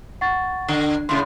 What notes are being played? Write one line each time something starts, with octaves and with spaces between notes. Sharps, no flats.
F#5 C#6 A6
D3
A2 C#3 G#3 C6